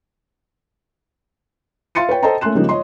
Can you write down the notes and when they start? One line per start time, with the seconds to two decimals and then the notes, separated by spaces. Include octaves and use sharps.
1.95 E5 F5 C6 A6 C#7 D#7
2.09 B4 C#5 G5
2.23 A4 C5 D#5 G5 A5 A#5
2.41 A3 A#3 C#4 C6 F#6 E7
2.55 C#3 F3 G3 G#3 A#3 D#4
2.69 C#5 D#5 C6